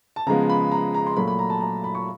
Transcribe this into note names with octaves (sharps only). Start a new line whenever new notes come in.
A5
C#3 F3 G#3 B3 A#5
B5
A#5
A#5
C6
A#2 F#3 A3 B5
B5
A#5
A5
A#5
B5
C#6